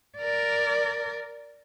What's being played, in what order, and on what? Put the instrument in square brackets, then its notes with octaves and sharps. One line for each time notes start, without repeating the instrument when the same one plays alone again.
[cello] A#4 D5